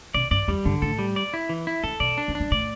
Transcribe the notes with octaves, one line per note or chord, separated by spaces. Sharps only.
B2 D5
G2 D5
E2 G3
G2 D3
A2 A4
G3
D5
E4
E3
E4
A2 A4
B2 D5
D4
E2
D4
G2
A2 D5